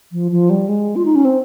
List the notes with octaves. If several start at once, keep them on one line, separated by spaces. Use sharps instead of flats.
F3
F3
G3
G#3
F4
D#4
C#4
C4